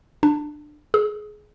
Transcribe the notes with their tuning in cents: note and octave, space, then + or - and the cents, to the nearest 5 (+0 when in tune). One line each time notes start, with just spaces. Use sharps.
D4 +20
G#4 +20